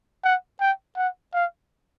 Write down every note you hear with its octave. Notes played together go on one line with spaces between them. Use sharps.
F#5
G5
F#5
F5